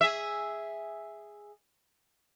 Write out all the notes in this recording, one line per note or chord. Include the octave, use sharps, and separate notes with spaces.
G#4 E5